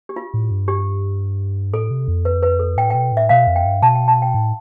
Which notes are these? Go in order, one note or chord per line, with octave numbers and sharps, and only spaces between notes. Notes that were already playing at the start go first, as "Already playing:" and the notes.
G4
F4
A2
G2
G4
A2 A4
C3
F2
B4
B4
A4
A2 G5
G5
B2
A2 E5
B2 F5
F2
G5
G2
B2 A5
G5
A5
G5
A2